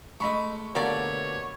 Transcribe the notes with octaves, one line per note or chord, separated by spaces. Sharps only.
G#3 A3 D#5 B5 C#6
B2 D3 A3 A#3 G4 C#5 D5